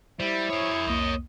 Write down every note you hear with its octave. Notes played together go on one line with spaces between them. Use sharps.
G3 E4 C5
G#4 A#4 C#5
C2 F2 A#3 D#5